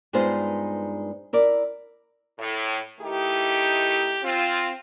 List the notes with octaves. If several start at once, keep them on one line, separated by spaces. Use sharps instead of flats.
G2 G#3 B3 D#4 F4 C5
E4 A#4 D5
A2
D#3 A3 D#4 E4 G4
C4 F4